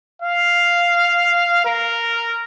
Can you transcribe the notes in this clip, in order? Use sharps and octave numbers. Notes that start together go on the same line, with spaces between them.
F5
A#4